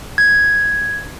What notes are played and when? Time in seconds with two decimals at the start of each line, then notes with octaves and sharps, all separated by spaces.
0.18 G#6